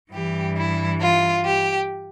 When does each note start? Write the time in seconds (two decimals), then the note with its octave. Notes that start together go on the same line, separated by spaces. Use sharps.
0.11 G2 E3 G3 G4
0.55 E4
1.00 F4
1.44 G4